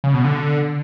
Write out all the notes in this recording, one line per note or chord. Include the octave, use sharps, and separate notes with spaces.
C#3
B2
D3